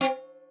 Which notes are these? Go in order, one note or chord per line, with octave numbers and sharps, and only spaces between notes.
C4